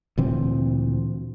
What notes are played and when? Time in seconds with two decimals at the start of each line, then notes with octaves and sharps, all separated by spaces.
0.18 D2 A#2 E3 C4